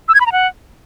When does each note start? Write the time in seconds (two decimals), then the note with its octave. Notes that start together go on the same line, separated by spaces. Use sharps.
0.08 E6
0.14 G#6
0.20 B5
0.26 A#5
0.32 F#5